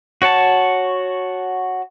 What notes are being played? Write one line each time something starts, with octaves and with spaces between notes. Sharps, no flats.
F#4 C#5 F#5 A5